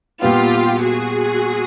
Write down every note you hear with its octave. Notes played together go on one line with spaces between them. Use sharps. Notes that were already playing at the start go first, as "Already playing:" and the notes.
A#2 G3 B3 F4 G4
F#4 G#4